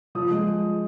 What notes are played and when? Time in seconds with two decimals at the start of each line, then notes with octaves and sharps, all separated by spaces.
0.15 F3 D#6
0.31 G#3